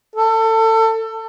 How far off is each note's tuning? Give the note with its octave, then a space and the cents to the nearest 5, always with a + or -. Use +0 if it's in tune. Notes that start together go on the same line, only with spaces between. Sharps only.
A4 +25